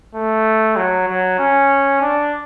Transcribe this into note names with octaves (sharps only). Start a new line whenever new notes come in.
A3
F#3
F#3
C#4
D4